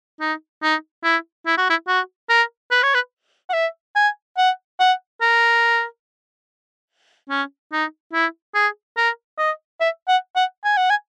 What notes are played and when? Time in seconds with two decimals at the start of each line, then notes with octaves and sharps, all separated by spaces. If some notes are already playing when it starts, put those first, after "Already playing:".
0.21 D#4
0.63 D#4
1.04 E4
1.46 E4
1.57 F#4
1.70 E4
1.88 F#4
2.29 A#4
2.71 B4
2.83 C#5
2.94 B4
3.50 F#5
3.54 E5
3.96 G#5
4.38 F#5
4.80 F#5
5.21 A#4
7.30 C#4
7.72 D#4
8.13 E4
8.55 G#4
8.97 A#4
9.38 D#5
9.81 E5
10.08 F#5
10.36 F#5
10.64 G#5
10.77 F#5
10.90 G#5